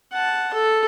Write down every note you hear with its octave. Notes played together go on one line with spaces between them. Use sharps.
F#5 A5
A4